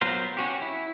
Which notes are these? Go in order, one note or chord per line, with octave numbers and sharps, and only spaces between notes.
F#3 B3 F4 A#4 C5
C#4 F#4 G4
E4